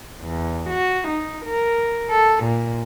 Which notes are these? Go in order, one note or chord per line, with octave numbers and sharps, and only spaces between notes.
E2
F#4
D#4
A#4
A4
A#2